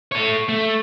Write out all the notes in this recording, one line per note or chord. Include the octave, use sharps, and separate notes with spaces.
A4 C#5
A3